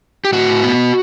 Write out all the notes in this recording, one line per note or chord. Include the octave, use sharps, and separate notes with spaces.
G4
A2 F#4
B3